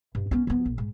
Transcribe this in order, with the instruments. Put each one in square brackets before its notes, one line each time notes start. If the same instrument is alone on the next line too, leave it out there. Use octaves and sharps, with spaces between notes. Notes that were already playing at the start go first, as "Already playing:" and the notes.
[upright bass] G2
B3 C#4
F3 B3
A#1
G#2